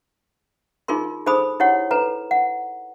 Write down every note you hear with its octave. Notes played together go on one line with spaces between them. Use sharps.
D#4 F4 G#4 A#4 C6
D#4 G#4 A4 C5 B5 D#6
E4 G4 C#5 F#5
A4 B4 A#5
F#5